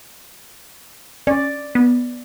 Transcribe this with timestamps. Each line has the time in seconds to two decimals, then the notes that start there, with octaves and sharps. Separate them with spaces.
1.27 C#4 D5
1.75 B3